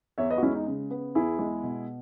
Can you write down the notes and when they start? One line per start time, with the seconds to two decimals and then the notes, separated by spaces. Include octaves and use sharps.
0.18 E2 C#5 E5
0.30 B4 D#5
0.38 F#4
0.42 G#3 C#4 E4
0.54 D#4
0.67 C#3
0.90 B3
1.15 E2 E4 G#4
1.39 G#3
1.63 B2